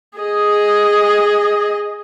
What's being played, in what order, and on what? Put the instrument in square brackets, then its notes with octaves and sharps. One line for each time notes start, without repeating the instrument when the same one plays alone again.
[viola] G#4 D#5